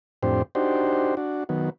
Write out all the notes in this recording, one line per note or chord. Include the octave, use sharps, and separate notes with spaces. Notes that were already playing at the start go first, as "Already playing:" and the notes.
F2 A2 C4 D4 G4 C5
D4 D#4 F#4 G4 C5
D4 F#4
D#3 F#3 B3